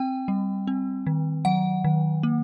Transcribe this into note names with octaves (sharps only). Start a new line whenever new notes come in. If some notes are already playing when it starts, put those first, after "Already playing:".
Already playing: C4 G5
G3
C4
D#3
F#3 F#5
D#3
A#3